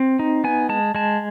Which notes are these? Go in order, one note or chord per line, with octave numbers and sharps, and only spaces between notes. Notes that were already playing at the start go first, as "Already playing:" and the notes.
Already playing: C4
D#4
B3 G#5
G#3 A5
G#3 A5